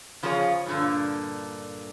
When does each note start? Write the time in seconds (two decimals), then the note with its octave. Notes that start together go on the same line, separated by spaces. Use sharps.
0.23 C#3 F3 F4 G#4 C#5
0.66 G2 A#2 D3